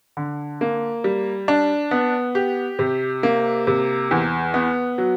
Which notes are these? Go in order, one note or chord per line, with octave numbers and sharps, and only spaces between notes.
D3
A#3
G3
D4
B3
G4
C3
A#3
C3
E2
B3
F#3